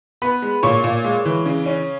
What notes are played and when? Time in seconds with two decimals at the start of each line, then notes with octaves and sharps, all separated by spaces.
0.22 B3 B4 B5
0.42 G#3
0.63 A#2 C#5 C#6
0.84 A#2
1.05 G#3
1.25 E3
1.46 C#3
1.66 C#4